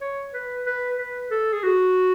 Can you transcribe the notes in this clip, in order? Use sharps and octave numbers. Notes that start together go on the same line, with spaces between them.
C#5
B4
B4
B4
A4
G#4
F#4